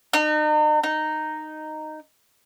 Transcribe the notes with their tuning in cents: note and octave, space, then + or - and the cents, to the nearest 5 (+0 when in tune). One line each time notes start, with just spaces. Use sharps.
D#4 -40
D#4 -10